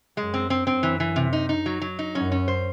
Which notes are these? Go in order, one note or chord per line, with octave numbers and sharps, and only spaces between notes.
F#2 G#3
C4
C4
F#2 C4
E3
E3
C3
D#4
D#4
F#3
F#3
D#4
F#2 C#4
C#4
C5